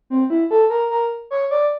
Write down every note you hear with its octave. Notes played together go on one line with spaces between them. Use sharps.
C4
E4
A4
A#4
A#4
C#5
D5